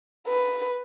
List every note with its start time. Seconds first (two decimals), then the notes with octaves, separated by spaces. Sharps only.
0.27 B4